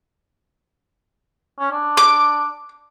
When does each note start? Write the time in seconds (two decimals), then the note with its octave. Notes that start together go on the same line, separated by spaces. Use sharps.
1.59 C#4
1.72 D4
1.97 D6